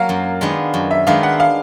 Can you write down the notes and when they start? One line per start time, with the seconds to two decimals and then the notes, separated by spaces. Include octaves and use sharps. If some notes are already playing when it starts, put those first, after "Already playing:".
Already playing: F#3 A#3 F5
0.09 F#2
0.41 D#3 G#3 B3 D4
0.74 F#2
0.91 E5
1.07 D#3 G#3 B3 D4 F5
1.23 F#5
1.40 F5